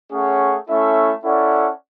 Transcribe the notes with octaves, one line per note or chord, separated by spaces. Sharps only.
A3 C#4 G#4 C#5 F#5
A3 C#4 E4 A4 E5
C#4 E4 A4 D5 F#5